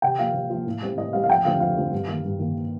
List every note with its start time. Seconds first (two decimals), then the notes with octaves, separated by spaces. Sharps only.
0.02 C3 G5
0.19 F3 A#3 F5
0.34 C3
0.50 F3 A#3
0.66 A2
0.82 G3 C4
0.97 A2 D#5
1.13 G3 C4 F5
1.23 F5
1.29 F2 G5
1.45 D3 F3 A3 C4 F5
1.60 F2 F5
1.77 D3 F3 A3 C4
1.92 G2
2.08 D#3 A#3
2.24 G2
2.39 D#3 A#3